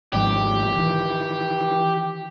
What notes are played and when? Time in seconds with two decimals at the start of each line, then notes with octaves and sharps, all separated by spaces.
0.14 G#1 G#2 F3 G4
0.76 D#3 E3